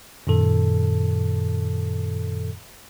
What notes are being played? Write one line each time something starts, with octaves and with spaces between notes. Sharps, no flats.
F#2 A#2 D#3 A4